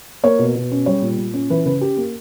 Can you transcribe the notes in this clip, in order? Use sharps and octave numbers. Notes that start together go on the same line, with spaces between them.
A#3 C#5
B2
B2
C#4
G3 C#5
A#2
A#2
C#4
E3 B4
C#3 B4
C#4 G4
A#3